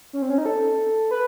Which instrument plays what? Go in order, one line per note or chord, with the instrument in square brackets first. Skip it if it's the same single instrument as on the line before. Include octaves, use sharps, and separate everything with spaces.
[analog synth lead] C#4
C4
C#4
D#4
A4
B4